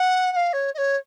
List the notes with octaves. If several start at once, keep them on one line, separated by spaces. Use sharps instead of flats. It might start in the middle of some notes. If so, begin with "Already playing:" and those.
Already playing: F#5
F#5
F5
C#5
D#5
C#5